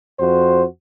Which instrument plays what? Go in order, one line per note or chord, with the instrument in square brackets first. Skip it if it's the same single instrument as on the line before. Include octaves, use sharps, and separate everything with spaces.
[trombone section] F2 F#4 C5